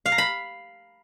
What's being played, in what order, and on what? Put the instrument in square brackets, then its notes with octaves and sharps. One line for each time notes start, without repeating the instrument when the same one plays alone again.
[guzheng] F5
A#5
B5